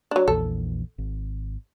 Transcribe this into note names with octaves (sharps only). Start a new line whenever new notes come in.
F#3 D4
A#1 E2 A4
G#1